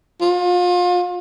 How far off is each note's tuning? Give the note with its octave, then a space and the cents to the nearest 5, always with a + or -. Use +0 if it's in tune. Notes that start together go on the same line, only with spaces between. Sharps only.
F4 +35